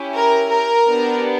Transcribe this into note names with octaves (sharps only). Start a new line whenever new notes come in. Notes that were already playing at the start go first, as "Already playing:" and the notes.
Already playing: C#4 E4 G4
A#4
A#4
B3 D4 G4